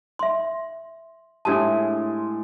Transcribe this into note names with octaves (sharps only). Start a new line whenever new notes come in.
E5 C6
A2 G#3 D4 G4 A5